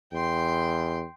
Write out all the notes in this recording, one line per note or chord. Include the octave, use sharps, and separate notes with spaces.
E2 G5 C6